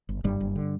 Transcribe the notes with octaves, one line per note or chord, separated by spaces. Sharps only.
G1
F#1 G2 G3
F#1
D3